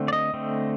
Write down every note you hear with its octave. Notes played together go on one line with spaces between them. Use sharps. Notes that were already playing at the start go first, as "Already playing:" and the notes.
Already playing: D3 A3 C4
D5
D#5
D3 A3 C4